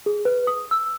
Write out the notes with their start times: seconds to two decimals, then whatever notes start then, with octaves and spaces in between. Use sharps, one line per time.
0.06 G#4
0.25 B4
0.47 D#6
0.71 E6